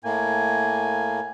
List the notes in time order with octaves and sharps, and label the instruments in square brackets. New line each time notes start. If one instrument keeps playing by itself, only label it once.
[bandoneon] A2 A#3 [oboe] G#5